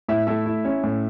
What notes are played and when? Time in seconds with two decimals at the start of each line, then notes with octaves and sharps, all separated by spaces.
0.08 A2 E4 E5
0.27 A3 E4 E5
0.46 E4
0.65 C#4
0.83 A2